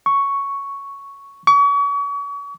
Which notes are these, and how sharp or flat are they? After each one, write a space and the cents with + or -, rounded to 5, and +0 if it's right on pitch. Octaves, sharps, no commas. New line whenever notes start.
C#6 +5
C#6 +40